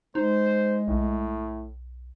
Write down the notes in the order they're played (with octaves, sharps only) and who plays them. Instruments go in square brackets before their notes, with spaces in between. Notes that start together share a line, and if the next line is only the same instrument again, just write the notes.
[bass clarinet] G#3 [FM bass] D#4 [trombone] C5
[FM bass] B1 [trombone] A2